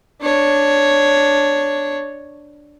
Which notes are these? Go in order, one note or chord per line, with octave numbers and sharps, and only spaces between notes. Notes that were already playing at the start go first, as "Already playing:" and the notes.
D4 C#5